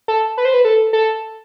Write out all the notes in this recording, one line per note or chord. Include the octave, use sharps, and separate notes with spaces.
A4
B4
C5
B4
A4
A4